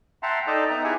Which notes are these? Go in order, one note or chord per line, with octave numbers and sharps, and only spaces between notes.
E5 F#5 G5 A5 A#5 C6
D#4 A4 D5 D#5 A5 A#5
B3 D#4 E5 G5 A#5
E4 G4 G#4 E5 F#5 G#5